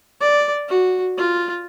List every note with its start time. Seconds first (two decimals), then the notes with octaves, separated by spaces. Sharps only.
0.21 D5
0.68 F#4
1.18 F4